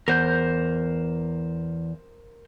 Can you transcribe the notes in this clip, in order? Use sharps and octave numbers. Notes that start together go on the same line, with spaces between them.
E2 A#4 C5 G6